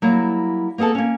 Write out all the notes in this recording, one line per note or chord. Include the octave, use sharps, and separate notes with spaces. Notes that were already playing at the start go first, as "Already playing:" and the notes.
F#3 G3 A#3 E4
A#3 B3 G#4 A4 A5
A#3 C#4